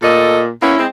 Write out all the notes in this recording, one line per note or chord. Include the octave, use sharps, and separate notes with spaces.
A#2 A3 A4 D#5
A#3 B3 C#4 E4
G#3 C4